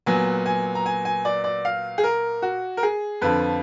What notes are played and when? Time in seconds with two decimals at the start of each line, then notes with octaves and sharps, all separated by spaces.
0.06 A#2 F#3 B3 G#5
0.46 G#5
0.75 A#5
0.86 G#5
1.05 G#5
1.25 D5
1.44 D5
1.65 F5
1.98 G#4
2.04 A#4
2.42 F#4
2.77 A#4
2.83 G#4
3.21 F2 D3 F3 B4